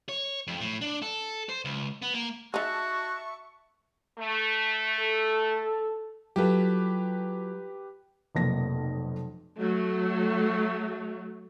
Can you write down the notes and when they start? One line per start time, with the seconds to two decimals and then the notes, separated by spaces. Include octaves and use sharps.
0.09 C#5
0.47 F2
0.60 A2
0.81 D4
1.02 A4
1.49 C5
1.65 C#2
2.02 B3
2.14 A#3
2.54 D#4 F#4 G#4 E5 A5 C#6
4.19 A3
4.99 A4
6.36 F#3 F4 G4 A4 B4
8.35 F1 B1 F2 A#3 A#6
9.58 F#3 A3